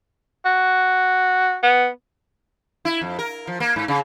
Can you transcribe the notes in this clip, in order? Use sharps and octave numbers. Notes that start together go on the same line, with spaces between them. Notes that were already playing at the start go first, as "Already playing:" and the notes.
F#4
B3
E4
F2
A#4
F3
A#3
G#2
C#3